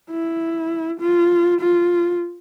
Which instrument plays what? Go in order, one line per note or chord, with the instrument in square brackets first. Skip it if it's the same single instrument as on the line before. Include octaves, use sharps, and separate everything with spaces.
[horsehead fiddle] E4
F4
F4